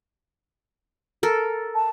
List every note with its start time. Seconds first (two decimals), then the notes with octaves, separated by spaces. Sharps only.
1.23 A4 A#4
1.75 A5